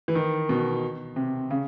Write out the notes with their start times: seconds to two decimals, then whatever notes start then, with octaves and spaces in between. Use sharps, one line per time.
0.08 E3
0.15 D#3
0.49 B2
1.16 C3
1.51 C#3